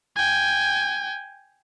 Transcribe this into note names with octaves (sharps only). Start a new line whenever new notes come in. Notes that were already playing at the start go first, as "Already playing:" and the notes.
G5 G#5